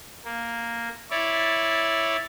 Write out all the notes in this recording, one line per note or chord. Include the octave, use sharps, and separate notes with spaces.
A#3
E4 C#5 D5